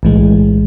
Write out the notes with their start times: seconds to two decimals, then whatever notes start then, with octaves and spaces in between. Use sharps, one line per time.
0.03 B1 A2 E3 G#3